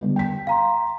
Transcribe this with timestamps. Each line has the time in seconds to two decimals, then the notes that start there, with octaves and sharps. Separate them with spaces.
0.01 D3 G3 B3
0.16 G5 B6
0.47 F5 A#5 C6